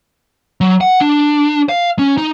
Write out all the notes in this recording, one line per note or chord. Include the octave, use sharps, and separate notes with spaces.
F#3
F#5
D4
F5
C#4
D#4